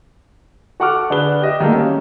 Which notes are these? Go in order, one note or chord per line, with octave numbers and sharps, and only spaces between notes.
F#4 A4 F#5 C#6 D6 F6
D3 D4 G#4 B4 G7
G4 D#5 E5
D#3 F#3 G3 A3 A#3 G#4
C#4